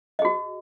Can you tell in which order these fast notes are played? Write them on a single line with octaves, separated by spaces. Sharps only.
D#5 G#4 F#4